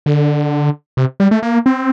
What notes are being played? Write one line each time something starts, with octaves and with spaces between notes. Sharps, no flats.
D3
C3
G3
A3
A#3
C4